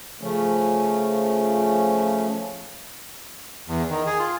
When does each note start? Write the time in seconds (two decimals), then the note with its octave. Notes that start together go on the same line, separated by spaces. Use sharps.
0.21 C#3 F3 A3 C#4
3.68 E2
3.89 D#3
4.06 G#4
4.19 F4